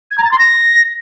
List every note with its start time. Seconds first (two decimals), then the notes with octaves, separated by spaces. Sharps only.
0.11 G#6
0.18 A#5
0.25 A6
0.32 C6
0.38 A#6